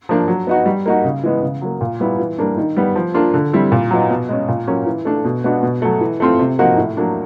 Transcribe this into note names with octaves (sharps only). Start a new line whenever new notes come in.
F3 A#3 D4
F#3
B3 D#4 F#4
G3
A#3 D#4 F#4
C#3
E3 G#3 B3
C#3
F#3 A#3
A#2
G3 B3 E4
E3
G3 A#3 D4
D#3
G3 B3
F3
A#3 D4 F4
D3
G3 C4 E4
A#2
F#3 B3 D#4
B2
G#3 C#4
A#2
F#3 A#3 C#4
E3
A3 D4
B2
G#3 B3 D4 F#4
B2
F#3 A3
E3
A3 C4 F4
C3
F3 A#3 D#4 F#4
A2
F#3 A#3 D4